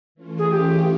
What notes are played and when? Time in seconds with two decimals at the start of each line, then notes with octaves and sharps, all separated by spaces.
0.15 E3 A3 C#4 F4
0.38 G#4
0.50 G4